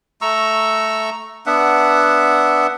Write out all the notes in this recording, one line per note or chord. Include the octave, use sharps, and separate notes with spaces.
A3 A#5 C#6 E6
B3 D4 E5 F#5